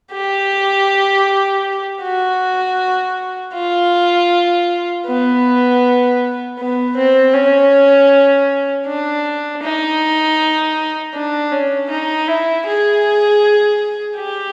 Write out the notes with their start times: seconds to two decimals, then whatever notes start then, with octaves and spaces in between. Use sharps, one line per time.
0.12 G4
2.02 F#4
3.53 F4
5.06 B3
6.58 B3
6.96 C4
7.33 C#4
8.86 D4
9.62 D#4
11.14 D4
11.52 C#4
11.90 D#4
12.28 E4
12.66 G#4
14.17 G4